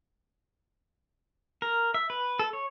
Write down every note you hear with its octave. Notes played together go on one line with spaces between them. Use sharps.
A#4
E5
B4
A4
C#5